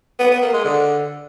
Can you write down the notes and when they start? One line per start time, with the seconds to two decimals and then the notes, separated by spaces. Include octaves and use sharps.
0.20 B3
0.31 B3
0.42 A#3
0.54 G#3
0.65 D3